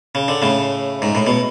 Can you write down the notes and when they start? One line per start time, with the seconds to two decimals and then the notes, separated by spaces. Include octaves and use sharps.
0.15 C#3
0.28 D3
0.42 A2 C#3
1.02 G#2
1.15 A2
1.27 B2